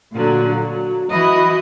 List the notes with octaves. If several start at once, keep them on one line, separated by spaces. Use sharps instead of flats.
A#2 D3 F#3
F#3
E3 E4 F#4 D#5